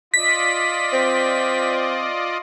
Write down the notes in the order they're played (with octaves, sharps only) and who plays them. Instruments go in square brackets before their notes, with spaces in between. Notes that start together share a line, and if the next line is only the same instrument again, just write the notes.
[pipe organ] F4 D5 D#5 [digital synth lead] B6
[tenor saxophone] C4